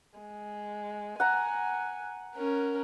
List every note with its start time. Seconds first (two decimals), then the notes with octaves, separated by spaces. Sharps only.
0.18 G#3
1.20 F#5 G#5 A#5
2.35 C#4 A#4